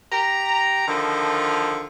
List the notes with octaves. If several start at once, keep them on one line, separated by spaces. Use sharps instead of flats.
G4 A#5
D3 D#3 F3